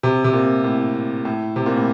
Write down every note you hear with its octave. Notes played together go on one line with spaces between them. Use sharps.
C3
C3
A#2
A2
A2
C3
A#2
A2